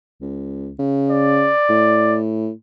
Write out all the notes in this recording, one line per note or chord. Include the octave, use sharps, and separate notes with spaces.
C#2
C#3
D5
A2